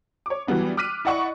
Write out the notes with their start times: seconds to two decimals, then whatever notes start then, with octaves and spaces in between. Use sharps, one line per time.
0.26 C#5 D6
0.47 E3 F#3 G3 B3 D4
0.77 D6 F6 F#6 B6 D#7
1.05 E4 D5 D#5 F#5 B5 C#6